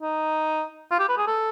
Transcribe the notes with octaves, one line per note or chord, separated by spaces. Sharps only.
D#4
F4
G4
B4
G#4
A4